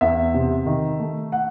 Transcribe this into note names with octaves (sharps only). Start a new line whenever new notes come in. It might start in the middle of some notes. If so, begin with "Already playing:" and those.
E2 E5
C3
D#3
A3
F#5